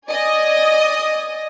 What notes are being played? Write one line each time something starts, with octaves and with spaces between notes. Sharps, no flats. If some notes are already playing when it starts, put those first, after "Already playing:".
D5 D#5 G#5 D#6